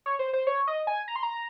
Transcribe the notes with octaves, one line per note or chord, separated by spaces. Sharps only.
C#5
C5
C5
C#5
D#5
G#5
A#5
C6
A#5